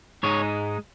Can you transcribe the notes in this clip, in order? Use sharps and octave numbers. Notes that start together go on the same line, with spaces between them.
G#2 G#3 D#4 C#5